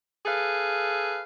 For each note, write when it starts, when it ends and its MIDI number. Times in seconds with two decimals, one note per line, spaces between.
0.26 1.21 68
0.26 1.21 69
0.26 1.21 71
0.26 1.21 77